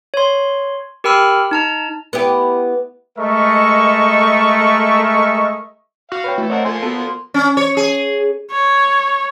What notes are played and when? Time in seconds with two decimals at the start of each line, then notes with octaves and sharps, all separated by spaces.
0.14 C#5 C6
1.04 G4 A#4 G5 B5 E6 F6
1.51 D#4 A5 A#5
2.13 B3 E4 G4
3.18 G#3 A3 A#4 D#5 E5 C#6
6.12 F#4 F5
6.24 B4 C#5 G5
6.38 E3 A3
6.50 C4 A#4 C#5 D#5 F#5 A5
6.65 F3 A#3 A4 G#5 C6
6.83 B3 F#4 A4
7.34 C#4
7.57 C#5
7.77 G#4
8.51 C#5